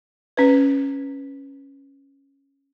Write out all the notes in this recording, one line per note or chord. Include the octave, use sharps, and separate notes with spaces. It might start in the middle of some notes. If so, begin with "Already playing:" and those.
C#4 B4